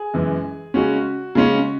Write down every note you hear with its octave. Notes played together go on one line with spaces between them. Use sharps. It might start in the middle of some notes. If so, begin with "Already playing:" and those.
Already playing: G#4
F#2 E3 G#3
C#3 G#3 C#4 F#4
C#3 G#3 C#4